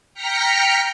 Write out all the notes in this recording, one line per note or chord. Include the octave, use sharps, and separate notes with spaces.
G5 A#5 F6 A#6 B6 C#7